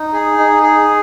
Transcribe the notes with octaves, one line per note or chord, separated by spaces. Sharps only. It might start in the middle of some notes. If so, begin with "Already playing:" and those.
Already playing: D#4
G#4
D#4
G#4